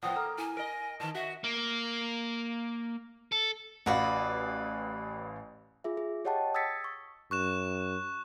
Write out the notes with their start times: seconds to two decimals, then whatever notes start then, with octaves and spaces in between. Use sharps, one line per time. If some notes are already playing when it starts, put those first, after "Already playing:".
0.03 A2 F3 B3 F#5 G5 D#6
0.16 A#3 A4 A#5 F6
0.38 E4 G#5
0.57 A#4 D#5 D7
1.00 A2 D#3 A5
1.15 F#4 E5
1.44 A#3
3.32 A4
3.86 A1 F#4 B4 D5 F5
5.84 F4 G#4 E5
5.97 G#4
6.25 G4 C#5 D#5 F#5 G5 A5
6.54 D#6 E6 G#6 A6 B6 C#7
6.84 C#6
7.31 F#2 C#6 F#6 E7